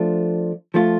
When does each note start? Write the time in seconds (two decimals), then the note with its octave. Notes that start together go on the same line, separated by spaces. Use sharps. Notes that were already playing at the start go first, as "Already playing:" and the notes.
Already playing: F3 A3 D4 F4
0.74 F3 A3 F4